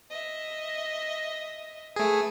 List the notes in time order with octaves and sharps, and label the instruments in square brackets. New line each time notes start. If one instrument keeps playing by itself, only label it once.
[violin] D#5 E5
[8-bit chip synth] A3 G#4 [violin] B4